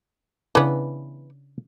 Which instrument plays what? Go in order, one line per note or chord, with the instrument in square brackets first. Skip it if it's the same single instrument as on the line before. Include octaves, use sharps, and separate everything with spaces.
[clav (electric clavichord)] C#3 D4 E4 [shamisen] E3 B3